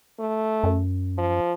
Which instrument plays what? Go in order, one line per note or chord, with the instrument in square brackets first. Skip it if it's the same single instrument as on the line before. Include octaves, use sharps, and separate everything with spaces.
[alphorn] A3
[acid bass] F#2
[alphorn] F3